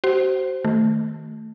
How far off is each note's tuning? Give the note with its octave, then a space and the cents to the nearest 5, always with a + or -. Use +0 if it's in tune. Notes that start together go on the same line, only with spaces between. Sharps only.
F#4 +40 C5 +0
D#3 +15 A3 +0